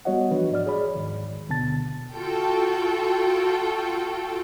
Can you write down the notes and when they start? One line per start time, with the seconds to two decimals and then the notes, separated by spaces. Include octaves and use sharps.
0.05 G3 B3 F#4 C#5 D#5 F#5
0.31 E3 F3 D4 F#4 B4
0.51 G#2 F3 D5 F6
0.66 G#4 C#5 D5 B5
0.95 D#2 G#2 D#3
1.48 D2 B2 D3 B3 A5 A6
2.13 F4 F#4 A4 G5